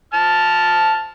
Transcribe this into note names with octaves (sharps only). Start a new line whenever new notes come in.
A5 F6